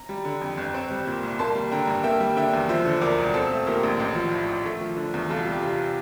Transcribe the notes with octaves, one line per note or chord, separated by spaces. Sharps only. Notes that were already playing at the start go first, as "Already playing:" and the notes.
Already playing: A#5
G3
D3
F2
G1
C4
G3
A#2
C2
A#3 A5 C6
G3
D3 G5 A#5
G2
A#3 E5 G5
G3
D3 E5 G5
E2
F3 C5 E5
D3
D2 A#4 D5
E1
C4 A4 C5
A3
A#2 G4 A#4
A#1
A1
F3
A2
A1
A3
F3
D3
E2
C2 F4 A4
G3
G4
C3 F4